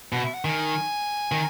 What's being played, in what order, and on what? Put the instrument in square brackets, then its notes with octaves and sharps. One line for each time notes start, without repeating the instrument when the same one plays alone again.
[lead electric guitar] B2 [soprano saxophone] F#5
[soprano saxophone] E5
F#5
[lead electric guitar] D#3 [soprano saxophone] G#5
[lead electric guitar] D#3